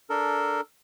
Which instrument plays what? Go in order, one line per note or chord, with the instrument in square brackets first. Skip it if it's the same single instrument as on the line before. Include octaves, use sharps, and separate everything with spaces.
[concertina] D4 A4 A#4